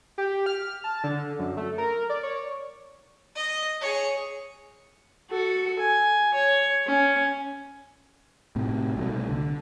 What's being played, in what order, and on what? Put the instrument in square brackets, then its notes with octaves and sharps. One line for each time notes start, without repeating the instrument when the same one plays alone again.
[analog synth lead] G4
F6
A5
D3
F#2
A3
A#4
D5
C#5
[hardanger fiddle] D#5
G#4 C#5
[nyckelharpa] F#4 A4
G#5
C#5
C#4
[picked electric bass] A2 C3
C2 B2 E3 A3
D3